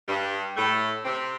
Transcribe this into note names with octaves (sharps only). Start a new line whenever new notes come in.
G2 G3
A2 A3
C3 C4